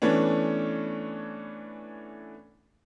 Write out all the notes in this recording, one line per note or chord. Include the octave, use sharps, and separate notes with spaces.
E3 A3 B3 C#4 D4